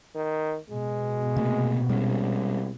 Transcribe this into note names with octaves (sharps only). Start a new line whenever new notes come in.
D#3
B2 G#3
C3 A3 A#3
C2 G3 G#3 C#4